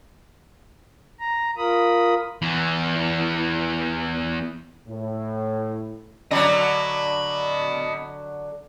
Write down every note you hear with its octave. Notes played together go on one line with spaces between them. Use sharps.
A#5
F4 A#4 B5 D#6
E2 E3
A2
D3 F#3 D#5 B5